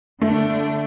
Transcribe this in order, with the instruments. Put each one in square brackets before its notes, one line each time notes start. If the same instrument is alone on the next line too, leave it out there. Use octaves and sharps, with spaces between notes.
[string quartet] D3 D4 [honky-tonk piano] A3